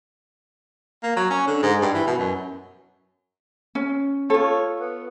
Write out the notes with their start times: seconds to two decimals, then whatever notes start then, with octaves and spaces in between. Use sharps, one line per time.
1.03 A#3
1.16 F#3
1.30 C#4
1.47 D3
1.62 G#2
1.82 G2
1.94 E3
2.07 B2
2.19 F#2
3.75 C#4
4.30 F4 A4 C#5
4.80 B3